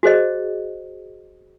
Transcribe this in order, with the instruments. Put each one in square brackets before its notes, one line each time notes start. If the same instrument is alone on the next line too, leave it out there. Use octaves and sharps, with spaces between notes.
[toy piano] F#4 G#4 C5 D#5